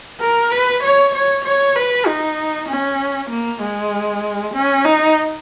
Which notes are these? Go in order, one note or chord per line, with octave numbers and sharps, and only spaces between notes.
A#4
B4
C#5
C#5
C#5
B4
D#4
C#4
A#3
G#3
C#4
D#4